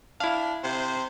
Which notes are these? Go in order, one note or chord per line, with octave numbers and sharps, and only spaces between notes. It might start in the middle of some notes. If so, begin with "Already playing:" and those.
D4 E4 F5
C3 C5